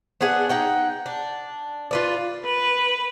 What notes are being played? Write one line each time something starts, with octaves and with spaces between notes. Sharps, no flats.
B3 D4 G#4 F#5
D#4 F#5 G5
D4
F4 B4 D5
B4